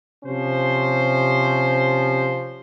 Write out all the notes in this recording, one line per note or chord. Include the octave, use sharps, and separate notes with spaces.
C3 F3 C#4 C5